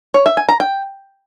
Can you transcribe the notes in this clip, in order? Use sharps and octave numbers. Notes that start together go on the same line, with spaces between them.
C#5
E5
G#5
A#5
G5